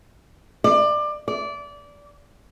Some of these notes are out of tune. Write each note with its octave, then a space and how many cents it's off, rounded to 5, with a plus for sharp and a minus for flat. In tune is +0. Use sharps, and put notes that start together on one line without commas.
D5 +25
D5 -20